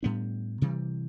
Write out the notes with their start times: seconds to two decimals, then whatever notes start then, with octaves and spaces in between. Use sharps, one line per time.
0.03 A2 G3 B3 D4
0.62 C3 E3 G3